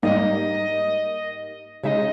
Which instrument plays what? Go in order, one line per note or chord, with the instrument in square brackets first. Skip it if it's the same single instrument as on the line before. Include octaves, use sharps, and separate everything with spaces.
[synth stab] G#2 G3 A#3 D#4 [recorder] D#5
[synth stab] C#3 G#3 D#4 [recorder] D#5 E5